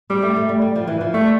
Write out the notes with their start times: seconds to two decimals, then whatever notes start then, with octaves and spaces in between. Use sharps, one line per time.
0.10 G3 C4
0.22 A3
0.36 A3
0.49 G3
0.62 G3
0.76 F3
0.87 E3
1.01 F3
1.14 G3 A3